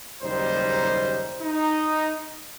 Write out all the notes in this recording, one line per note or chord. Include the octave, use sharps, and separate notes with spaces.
F#1 D#2 G3 D#4 C5
D#4